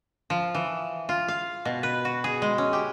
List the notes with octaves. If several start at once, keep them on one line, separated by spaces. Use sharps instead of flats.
F3
E3
F4
F5
B2
B4
F#4
G#4
G#3
C#4
G4